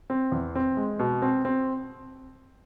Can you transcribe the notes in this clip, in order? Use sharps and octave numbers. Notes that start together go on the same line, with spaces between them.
C4
E2
C4
G#3
B2
C4
C4